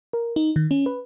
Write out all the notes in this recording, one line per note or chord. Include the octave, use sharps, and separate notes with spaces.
A#4
D#4
D#3
C#4
B4